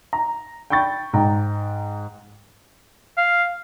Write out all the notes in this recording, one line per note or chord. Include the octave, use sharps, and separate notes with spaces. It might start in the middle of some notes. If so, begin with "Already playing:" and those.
A#5
G5 B5 C#6 G6 A6
G#2 G5 A#5
F5